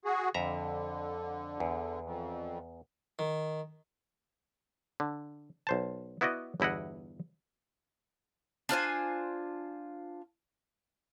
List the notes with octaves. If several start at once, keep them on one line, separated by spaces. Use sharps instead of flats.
F#4 G#4
F2 D3 E5 A#5
E2
F2
D#3
D3
B1 C5 A5
B3 E4 F#4 D5 D#5
G1 E2 E4 D#5 F#5
D4 F4 C5 G#5